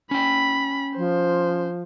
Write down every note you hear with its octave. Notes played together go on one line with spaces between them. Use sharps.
C#4 G5 B5
F3 C5